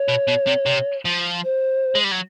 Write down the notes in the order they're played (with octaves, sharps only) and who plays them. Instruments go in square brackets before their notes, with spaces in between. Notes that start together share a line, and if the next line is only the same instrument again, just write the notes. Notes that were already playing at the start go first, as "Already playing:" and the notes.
Already playing: [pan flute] C#5
[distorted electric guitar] B2
B2
C3
C3
F3
[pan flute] C5
[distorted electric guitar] G#3
G3
F#3